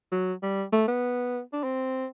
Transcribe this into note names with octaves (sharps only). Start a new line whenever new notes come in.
F#3
G3
A3
B3
D4
C4